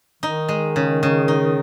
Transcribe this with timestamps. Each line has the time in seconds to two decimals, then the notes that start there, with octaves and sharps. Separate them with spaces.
0.23 D#3 D#4
0.49 G#3
0.76 C#3
1.03 C#3
1.28 D#4